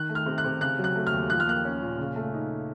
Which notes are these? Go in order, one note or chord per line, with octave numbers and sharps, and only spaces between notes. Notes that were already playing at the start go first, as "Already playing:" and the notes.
Already playing: D#3 F#6
A3
F6
C3
F#6
C3
C#3 F#6
F#3
F#6
A3
F6
D#2
F3 F#6
F6
A#3 F#6
C#4
A#2
C#3
A3
D#4